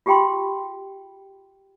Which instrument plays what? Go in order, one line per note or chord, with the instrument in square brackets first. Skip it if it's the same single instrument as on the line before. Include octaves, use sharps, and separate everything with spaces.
[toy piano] F4 G4 G#4 G5 B5 C6